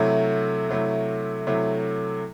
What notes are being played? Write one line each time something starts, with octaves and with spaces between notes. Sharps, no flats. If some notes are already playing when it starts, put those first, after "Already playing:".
Already playing: C3 F#3 A3 E4
C3 F#3 A3 E4
C3 F#3 A3 E4